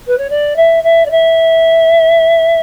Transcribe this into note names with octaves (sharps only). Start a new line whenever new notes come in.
B4
C#5
D5
E5
E5
D5
E5